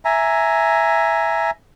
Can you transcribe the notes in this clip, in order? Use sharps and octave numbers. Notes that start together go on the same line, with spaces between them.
E5 G#5 A#5